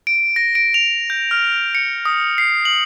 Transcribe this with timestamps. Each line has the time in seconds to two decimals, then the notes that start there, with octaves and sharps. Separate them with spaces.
0.07 D7
0.36 A#6
0.55 D7
0.74 F7
1.10 G6
1.31 F6
1.75 C#7
2.05 D#6
2.38 C7
2.65 F#7